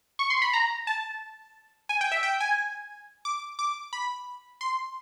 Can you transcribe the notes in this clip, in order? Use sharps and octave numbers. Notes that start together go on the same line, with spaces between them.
C#6
C6
B5
A#5
A5
G#5
G5
E5
G5
G#5
D6
D6
B5
C6